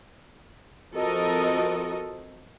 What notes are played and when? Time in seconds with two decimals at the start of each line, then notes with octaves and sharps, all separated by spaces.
0.94 F3 C4 F#4 A4 A#4 D#5